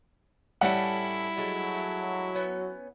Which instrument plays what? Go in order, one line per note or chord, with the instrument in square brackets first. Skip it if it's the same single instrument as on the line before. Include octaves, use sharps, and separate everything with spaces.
[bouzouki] A2 C#4 A4 [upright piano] G3 F#5 [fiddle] E4
[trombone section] F#3 [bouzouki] G#3 A3
[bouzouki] B3 C#4